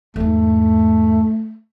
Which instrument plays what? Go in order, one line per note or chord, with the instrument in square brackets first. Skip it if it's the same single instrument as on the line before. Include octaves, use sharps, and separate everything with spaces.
[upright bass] E2 G#2 [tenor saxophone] A3